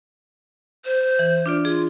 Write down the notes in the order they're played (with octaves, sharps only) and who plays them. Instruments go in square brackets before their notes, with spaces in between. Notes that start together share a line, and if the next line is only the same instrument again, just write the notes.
[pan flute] C5
[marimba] E3
D4 F4 D5
[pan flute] F4 [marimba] G#4